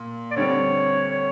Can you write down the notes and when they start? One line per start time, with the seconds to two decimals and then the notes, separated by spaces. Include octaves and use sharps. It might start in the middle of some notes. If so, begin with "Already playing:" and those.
Already playing: A#2
0.31 D5
0.36 D2 D3 G3 C4 C#5
1.09 C#5